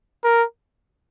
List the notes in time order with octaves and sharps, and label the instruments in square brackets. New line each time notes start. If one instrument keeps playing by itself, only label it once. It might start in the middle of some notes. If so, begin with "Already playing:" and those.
[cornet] A#4